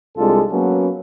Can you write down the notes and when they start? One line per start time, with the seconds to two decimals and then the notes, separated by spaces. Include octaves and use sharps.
0.17 C2 G#3 D4 F4 A4
0.51 F#3 A#3 B3 C#4